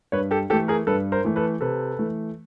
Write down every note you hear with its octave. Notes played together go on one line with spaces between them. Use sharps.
G2 B4 C#5
G4 A4
E3 A3 G4 A4
G#4 A#4
G2 A4 B4
A#4 C5
E3 A3
A4 B4
C3 A4 B4
E3 A3